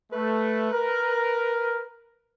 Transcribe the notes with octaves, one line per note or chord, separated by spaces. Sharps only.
A3 B4
A#4